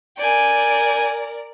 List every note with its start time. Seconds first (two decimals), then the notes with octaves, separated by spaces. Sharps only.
0.18 A#4 D5 G5 G#5